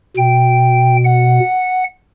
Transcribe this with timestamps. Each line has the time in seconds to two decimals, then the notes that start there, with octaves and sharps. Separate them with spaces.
0.17 B2 G5
1.05 F#5